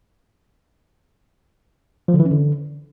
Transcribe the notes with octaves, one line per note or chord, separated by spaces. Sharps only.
F3
D3
E3
C#4
D3